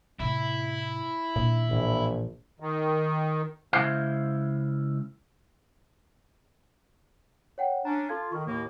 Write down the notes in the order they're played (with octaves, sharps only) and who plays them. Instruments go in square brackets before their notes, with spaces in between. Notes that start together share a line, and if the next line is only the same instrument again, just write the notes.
[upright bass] A2 C3 [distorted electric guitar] E4
[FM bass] A#2 [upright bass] D#3 D4
[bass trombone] A#1 [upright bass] A2 E3
[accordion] D#3
[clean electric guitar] C#3 G#3 E4 C5 F5
[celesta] C#5 F#5 G5
[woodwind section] C#4 D4 [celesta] A#5
[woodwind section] F4 [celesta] A4 A5 G#6
[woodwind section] D#3 [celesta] C#6
[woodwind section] D#2 A2 A#3